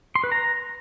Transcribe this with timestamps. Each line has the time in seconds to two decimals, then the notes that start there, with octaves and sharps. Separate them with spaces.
0.16 C6
0.24 B4
0.32 A#5